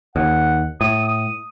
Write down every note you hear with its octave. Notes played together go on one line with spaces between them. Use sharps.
D#2 F#5
A2 D#6
D#6